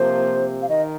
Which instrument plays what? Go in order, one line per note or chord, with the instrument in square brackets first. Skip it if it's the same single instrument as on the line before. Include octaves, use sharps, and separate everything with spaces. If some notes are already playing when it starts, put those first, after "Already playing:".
Already playing: [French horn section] C3 F3 A#3 [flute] C5
[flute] F5
[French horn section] D#3 [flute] D#5